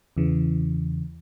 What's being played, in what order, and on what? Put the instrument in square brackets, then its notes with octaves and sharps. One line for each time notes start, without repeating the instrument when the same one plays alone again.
[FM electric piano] E2 C#3 E3